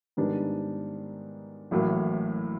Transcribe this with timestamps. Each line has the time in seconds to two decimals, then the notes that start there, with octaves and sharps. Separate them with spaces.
0.17 G#2 D#3 G3 B3 D4
1.71 A1 A2 F#3 A#3